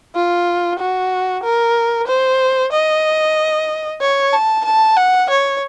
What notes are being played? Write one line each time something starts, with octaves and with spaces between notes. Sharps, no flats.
F4
F#4
A#4
C5
D#5
C#5
A5
A5
F#5
C#5